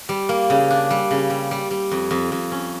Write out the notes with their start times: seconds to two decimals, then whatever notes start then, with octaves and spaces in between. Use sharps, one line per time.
0.09 G3
0.29 A#3
0.50 C#3
0.70 D4
0.90 G3
1.11 C#3
1.30 G3
1.51 G3
1.71 G3
1.92 F2
2.11 F2
2.32 F2
2.52 C#4